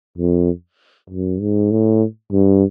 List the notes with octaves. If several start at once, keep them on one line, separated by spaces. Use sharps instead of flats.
F2
F#2
G#2
A2
G2